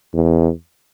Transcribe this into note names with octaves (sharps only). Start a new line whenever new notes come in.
E2